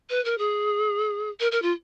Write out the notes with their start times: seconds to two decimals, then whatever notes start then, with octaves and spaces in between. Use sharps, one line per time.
0.09 B4
0.24 A#4
0.38 G#4
1.40 A#4
1.51 A#4
1.62 F4